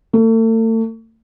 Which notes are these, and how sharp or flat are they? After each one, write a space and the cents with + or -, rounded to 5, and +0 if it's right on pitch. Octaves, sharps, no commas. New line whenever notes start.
A3 +40